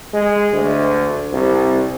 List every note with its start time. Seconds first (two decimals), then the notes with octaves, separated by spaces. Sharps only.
0.14 G#3
0.53 D2
1.33 C2